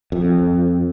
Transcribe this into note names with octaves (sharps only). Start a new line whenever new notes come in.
F2